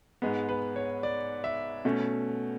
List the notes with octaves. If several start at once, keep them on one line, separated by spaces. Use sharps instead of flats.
G#2 G#3 B3
B4
C#5
D5
E5
B2 A3 C#4